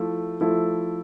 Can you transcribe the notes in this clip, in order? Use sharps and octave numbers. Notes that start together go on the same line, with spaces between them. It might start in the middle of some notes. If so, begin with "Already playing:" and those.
Already playing: F3 A3 E4 A4
F3 A3 E4 A4